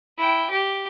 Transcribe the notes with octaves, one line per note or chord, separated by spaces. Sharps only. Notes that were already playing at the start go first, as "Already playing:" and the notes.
E4 G5
G4